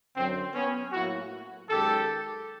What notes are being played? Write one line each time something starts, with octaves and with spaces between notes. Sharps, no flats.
F#2 D3 F#3 C4
B3 C#4
A2 F#3 A#3 E4 F#4
F#2 D#3 G#3 G4 A4